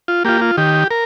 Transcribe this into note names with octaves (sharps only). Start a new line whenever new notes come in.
F4
A#3 F4 G4
F4
D#3 G4
A#4